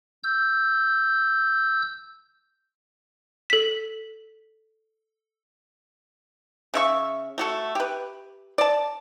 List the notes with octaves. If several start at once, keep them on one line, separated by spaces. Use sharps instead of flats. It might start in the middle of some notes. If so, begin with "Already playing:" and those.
E6 G6
A4 B6
C#3 E5 C#6
A3 F#4 A4
G4 B4
D5 A5